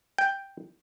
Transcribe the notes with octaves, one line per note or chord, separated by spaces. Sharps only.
G5